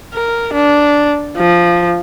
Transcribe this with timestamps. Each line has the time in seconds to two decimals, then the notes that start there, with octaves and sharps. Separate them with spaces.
0.14 A#4
0.53 D4
1.37 F3